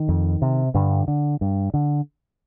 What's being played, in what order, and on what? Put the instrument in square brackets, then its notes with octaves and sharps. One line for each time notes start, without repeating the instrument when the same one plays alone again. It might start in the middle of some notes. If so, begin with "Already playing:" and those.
Already playing: [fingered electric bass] D#3
F2
C3
G2 D3
D3
G2
D3